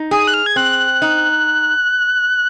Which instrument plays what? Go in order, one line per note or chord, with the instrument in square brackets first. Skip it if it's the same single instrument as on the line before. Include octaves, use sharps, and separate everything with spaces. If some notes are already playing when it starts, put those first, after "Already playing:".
Already playing: [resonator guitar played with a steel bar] D#4
[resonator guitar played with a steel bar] G#4 [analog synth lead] D#6
[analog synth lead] F#6
F6
G#6
[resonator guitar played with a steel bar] C4 [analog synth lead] F#6
[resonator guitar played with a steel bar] D#4